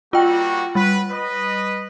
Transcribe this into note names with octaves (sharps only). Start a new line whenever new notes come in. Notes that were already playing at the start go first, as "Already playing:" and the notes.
G3 A#3 F4 F#4 G5
G3 B4
B4 D#5